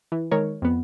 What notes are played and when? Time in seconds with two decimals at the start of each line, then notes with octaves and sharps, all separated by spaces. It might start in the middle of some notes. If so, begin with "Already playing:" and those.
0.12 E3
0.31 D#3 G#3 A#4 C#5
0.62 F2 B3